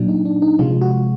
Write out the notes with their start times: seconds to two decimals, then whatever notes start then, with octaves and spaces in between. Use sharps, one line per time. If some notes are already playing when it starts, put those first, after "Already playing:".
Already playing: A#2 F#3 D4
0.08 D#4
0.26 D4
0.42 D#4
0.59 C3 F3 G#3 F4
0.82 F#4